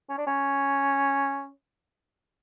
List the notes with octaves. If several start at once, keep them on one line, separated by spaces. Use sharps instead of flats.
C#4
D4
C#4